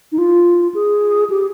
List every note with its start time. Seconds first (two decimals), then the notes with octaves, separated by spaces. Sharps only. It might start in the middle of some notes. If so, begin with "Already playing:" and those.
0.12 D#4
0.18 F4
0.75 G#4
1.30 G4